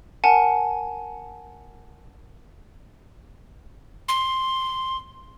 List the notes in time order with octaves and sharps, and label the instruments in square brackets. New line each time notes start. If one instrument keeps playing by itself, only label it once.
[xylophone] A#4 F#5 G#5 A5
[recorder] C6